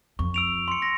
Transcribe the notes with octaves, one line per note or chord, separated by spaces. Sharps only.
F2 C#6
E6 D7 F7
C6 C#7
A#6